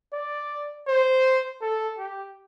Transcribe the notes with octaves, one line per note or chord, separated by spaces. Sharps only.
D5
C5
A4
G4